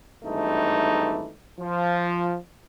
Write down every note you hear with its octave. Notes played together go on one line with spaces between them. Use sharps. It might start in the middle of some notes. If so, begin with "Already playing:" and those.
G#1 G2 E3 A3 D#4
F3